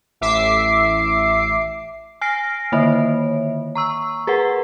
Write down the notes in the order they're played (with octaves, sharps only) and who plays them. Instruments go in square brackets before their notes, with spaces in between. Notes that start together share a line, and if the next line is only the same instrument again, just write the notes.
[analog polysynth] A1 E5 D6 C7
[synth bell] G#5 F6 A#6 C7 D7
D3 D#3 A#3 C#5 E5
A#5 C#6 E6
G#4 A#4 B4 F#5